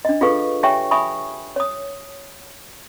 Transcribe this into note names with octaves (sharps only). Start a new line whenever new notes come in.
D4 D#5
F4 G#4 A4 B4 F5 C#6
G4 C#5 E5 G5 G#5 C#6
E5 G#5 B5 C#6 D#6
C#5 D#6